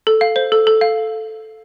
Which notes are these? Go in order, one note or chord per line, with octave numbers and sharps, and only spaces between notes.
A4
F5
C5
A4
A4
F5